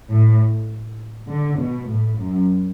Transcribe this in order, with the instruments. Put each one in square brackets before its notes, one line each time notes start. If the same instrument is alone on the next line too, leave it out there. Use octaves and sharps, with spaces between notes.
[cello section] A2
D3
B2
A2
F#2